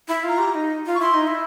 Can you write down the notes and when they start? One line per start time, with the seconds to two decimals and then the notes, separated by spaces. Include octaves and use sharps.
0.08 E4 B5
0.24 F4 A#5
0.39 G4
0.54 D#4
0.86 F4
0.95 C#6
0.99 E4 C6
1.14 D#4
1.27 E4